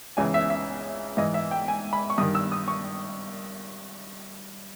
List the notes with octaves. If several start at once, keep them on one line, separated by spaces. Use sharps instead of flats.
C#2 C#3 E3 G#5
E5
E5
G#2 E3 D#5
E5
G5
G#5
B5
C#6
G2 D#3 D#6
E6
D#6
C#6